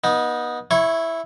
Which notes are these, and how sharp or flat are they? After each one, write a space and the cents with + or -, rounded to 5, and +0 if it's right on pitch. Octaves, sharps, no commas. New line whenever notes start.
B3 -30 D#4 +0
E4 +0 C#5 +0 C#6 -30